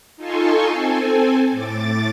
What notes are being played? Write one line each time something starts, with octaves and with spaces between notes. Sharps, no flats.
D#4 F4 A4 G#5 C6 C#6
C4 A4 G#5
A2 D6 A6